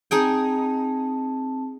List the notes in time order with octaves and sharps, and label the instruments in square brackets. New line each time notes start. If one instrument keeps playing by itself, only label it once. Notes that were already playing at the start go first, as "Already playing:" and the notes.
[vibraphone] C4 A5 [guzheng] D#4 G#4 G5